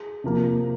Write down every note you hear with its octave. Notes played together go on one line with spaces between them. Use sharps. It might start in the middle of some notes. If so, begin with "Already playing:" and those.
Already playing: G#4
C3 F3 A#3